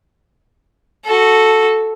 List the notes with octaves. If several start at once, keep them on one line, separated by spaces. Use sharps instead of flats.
F#4 A4